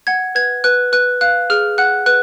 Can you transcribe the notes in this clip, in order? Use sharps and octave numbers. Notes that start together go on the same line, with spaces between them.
F#5 G#6
B4 G#6
B4 F#6
B4 F#6
F5 F#6
G#4 F6
F#5 F#6
B4 F#6